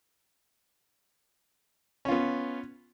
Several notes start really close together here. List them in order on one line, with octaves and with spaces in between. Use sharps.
C#4 F4 B3